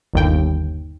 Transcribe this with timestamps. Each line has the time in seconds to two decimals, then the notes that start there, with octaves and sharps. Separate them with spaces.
0.14 G1 D#2 G5